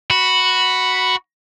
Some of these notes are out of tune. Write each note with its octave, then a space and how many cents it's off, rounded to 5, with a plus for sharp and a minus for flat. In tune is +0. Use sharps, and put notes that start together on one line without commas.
F#4 +0 B5 +0